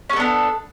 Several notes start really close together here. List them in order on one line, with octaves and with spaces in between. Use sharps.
C#4 A4 B3 D4